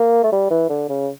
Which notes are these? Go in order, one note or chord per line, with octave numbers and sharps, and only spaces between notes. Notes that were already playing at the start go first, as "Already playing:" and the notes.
Already playing: A#3
A3
G3
E3
D3
C#3